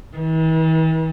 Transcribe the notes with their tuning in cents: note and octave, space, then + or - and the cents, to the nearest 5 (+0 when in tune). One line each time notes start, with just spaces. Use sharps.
E3 -45